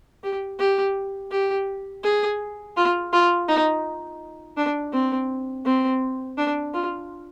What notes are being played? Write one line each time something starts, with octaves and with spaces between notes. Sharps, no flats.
G4
G4
G4
G#4
F4
F4
D#4
D4
C4
C4
D4
F4